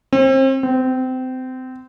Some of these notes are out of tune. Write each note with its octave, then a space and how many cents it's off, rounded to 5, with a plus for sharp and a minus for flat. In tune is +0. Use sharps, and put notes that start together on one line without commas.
C4 +35
C4 -25